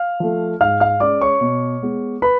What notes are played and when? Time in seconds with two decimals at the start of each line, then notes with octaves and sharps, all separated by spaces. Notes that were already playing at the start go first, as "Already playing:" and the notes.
Already playing: F5 F6
0.20 F3 A3
0.60 G#2 F5 F6
0.80 F5 F6
1.00 G#3 C#4 D5 D6
1.21 C#5 C#6
1.41 B2
1.82 G#3 B3
2.22 B4 B5